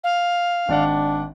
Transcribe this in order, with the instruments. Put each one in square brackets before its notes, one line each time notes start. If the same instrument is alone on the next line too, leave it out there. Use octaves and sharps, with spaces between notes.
[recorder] F5
[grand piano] G#1 D5 F#5 [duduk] D4